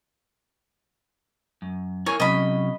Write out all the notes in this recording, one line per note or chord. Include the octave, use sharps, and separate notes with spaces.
F#2
E4 A#4 C#5 G#5
C3 F#3 C#4 D#5 B5